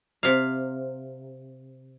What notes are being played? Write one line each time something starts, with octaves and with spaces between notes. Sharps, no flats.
C3 F5